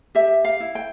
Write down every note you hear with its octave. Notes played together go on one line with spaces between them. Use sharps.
G4 E5
F5
E4
G5